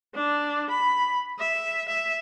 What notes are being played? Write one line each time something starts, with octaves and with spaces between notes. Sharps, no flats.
D4
B5
E5
E5